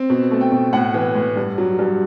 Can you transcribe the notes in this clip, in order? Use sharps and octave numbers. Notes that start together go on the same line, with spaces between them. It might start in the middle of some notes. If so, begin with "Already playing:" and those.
Already playing: C4
B2
A3
G5
B2
A2 F#5
E3
A2
G2
F#3
G2